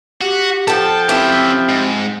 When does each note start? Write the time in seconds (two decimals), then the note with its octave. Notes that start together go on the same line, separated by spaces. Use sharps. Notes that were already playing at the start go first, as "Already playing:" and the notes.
0.21 F#4 G4
0.68 F3 A4 F#5 G5 A5
1.09 C4 C#4 E4 G4 E5
1.69 G#2